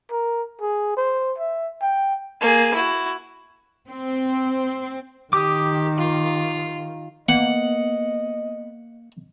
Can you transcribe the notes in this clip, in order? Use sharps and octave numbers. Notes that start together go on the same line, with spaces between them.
A#4
G#4
C5
E5
G5
A#3 G#4
E4 F#4
C4
D#3 G4 D6 D#6
F4
A#3 B3 D#5 F#5